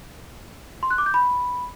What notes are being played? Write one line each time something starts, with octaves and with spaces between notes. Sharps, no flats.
C6
F#6
D6
G6
B5